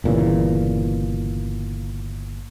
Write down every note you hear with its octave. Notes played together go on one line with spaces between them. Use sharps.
G1 A#2 C#3 E3